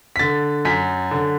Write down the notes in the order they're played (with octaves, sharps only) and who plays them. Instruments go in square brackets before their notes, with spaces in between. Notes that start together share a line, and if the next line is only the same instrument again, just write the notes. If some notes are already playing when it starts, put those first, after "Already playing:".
[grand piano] B6
D3 A6
F#2 B6
D3